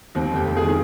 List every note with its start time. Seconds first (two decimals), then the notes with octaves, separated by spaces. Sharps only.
0.15 D#2 C4
0.31 F1 G4
0.47 F1
0.57 G#4
0.62 D#3
0.68 G#4